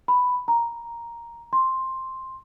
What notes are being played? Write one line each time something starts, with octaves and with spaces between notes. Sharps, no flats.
B5
A#5
C6